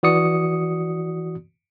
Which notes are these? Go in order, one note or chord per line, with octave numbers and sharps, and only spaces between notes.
E3 F#4 D5 D#6 C#7